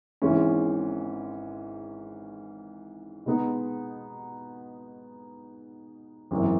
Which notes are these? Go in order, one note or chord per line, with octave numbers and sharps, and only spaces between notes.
G#1 G#2 E3 G#3 C#4
B2 G#3 B3 D#4
G#1 F#2 E3